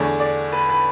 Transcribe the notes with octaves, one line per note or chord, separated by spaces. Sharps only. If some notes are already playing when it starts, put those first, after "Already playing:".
Already playing: E2 D3 A3 D4 C#5
D5
B4
B4